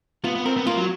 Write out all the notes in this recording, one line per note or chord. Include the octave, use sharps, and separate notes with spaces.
B3 F4
B3
C4 A#4
B3
A#3 F4
F#3